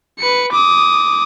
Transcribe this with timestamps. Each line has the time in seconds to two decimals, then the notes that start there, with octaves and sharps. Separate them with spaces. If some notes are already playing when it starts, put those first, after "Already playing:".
0.19 B4 C#7
0.52 D6 D#6